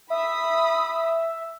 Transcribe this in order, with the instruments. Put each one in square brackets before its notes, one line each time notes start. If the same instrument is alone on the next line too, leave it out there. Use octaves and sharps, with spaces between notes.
[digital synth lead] E5 [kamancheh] B5 D#6